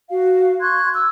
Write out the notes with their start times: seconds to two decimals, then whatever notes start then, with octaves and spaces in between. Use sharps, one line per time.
0.08 F#4 F5
0.61 C6 C#6 F#6 G#6
0.95 E6